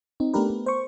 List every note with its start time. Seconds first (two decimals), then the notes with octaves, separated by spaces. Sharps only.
0.20 C4 D#4
0.34 A3 B3 D4 G4 A#4 B4
0.50 B3
0.66 C5 C#6